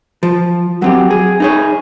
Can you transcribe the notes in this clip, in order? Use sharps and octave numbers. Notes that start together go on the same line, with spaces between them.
F3
F#3 C4 G4
G#4
D#4 G#4 C#5